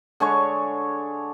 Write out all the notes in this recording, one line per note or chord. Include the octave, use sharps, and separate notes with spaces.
D3 G#3 C#5 C#6